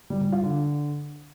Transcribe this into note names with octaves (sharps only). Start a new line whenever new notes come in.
G3
G3
F4
D3